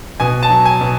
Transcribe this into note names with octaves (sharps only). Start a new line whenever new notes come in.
B2 G#5
A5
F#3
G#5
B2